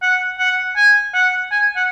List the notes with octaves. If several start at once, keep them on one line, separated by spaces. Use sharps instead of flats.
F#5
F#5
G#5
F#5
G#5
F#5